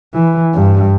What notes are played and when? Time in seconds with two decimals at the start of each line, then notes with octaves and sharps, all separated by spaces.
0.14 E3
0.54 G2